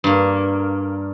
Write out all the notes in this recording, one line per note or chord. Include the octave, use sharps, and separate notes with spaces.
G2 A#3